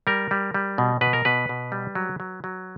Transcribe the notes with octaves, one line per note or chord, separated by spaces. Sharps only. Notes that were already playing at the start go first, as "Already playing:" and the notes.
G3 A#4
G3
G3
B2
B2 B4
A#4
B2 B4
B2
G3
F#3
F#3
F#3